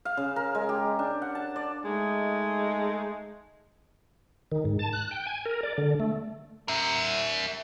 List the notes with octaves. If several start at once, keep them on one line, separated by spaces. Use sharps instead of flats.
F5
C#3
A#4
G#3
G4
D4
F#5
A5
D5
G#3 A3 D#4
D#3
G#2
A5
F#6
G5
G#5
A#4
D5
D3
A3
A#4 E5